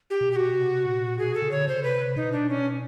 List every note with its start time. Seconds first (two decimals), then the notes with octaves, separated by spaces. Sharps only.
0.10 G4
0.21 B2
0.32 G4
0.36 F#4
0.53 C3
0.86 A#2
1.18 B2 G#4
1.35 A4
1.42 C#3
1.51 D3 C#5
1.68 C#3 C5
1.83 C3 B4
2.16 B2 D#4
2.32 D4
2.49 C#4